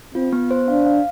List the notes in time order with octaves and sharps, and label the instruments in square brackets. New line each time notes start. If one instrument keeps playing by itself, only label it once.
[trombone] C4 [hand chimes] F4
[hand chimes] B3
C5
[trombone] D4 [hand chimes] F5
[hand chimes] F5